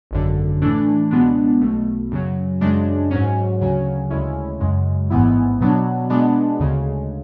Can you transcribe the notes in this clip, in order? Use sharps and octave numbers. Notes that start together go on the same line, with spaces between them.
G#1 F#2 D3
A2 E3 A3 D4
C#2 B2 G#3 B3 D4
B1 B2 A3
F#2 C#3 F#3
F#2 C#3 G#3 D4
G#2 F#3 C#4
D2 C#3 F#3 C#4
D2 C#3 G#3 C#4 E4
F#2 C#3 G#3
A1 G#2 E3 B3 E4
B2 F#3 B3 D4
B2 G#3 B3 D4
D2 C#3 G#3